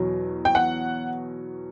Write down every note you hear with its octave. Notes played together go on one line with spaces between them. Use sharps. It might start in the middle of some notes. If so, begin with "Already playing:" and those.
Already playing: E2 B2 F#3
G5
F#5